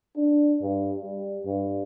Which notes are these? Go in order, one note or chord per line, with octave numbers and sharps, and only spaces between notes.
D4
G2
G3
G2